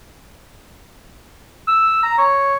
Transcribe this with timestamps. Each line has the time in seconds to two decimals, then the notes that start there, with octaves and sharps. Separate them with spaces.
1.68 E6
2.03 A#5
2.18 C#5